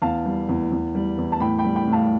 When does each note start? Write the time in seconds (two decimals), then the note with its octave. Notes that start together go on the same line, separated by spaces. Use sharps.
0.02 E2 F5 A5
0.26 G3
0.49 E2
0.72 E2
0.95 G3
1.18 E2
1.32 A5
1.40 A2 G5 B5
1.59 G5 B5
1.64 G3
1.76 G5 B5
1.87 A2
1.92 F5 A5